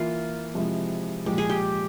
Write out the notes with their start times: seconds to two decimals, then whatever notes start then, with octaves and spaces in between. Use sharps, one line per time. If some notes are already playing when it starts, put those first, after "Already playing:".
Already playing: E3 A#3 E4 F4
0.54 C3 F3 G#3 E4
1.26 A#2 F3 G#3 G4
1.38 G#4
1.50 G4